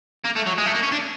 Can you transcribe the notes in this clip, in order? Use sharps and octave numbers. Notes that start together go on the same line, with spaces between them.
A#3
A3
F#3
G#3
A3
A#3
C#4
D4